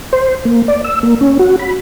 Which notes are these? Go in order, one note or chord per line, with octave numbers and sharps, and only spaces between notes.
C5
A#3
D5
E6
A#3
C#4
F#4
B5